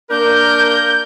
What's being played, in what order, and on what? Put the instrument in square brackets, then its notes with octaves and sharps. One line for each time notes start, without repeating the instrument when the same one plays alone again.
[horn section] A#3 D4 A#4 [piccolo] G6